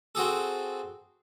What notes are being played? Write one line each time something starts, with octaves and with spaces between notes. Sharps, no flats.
C4 F#4 G#4 A4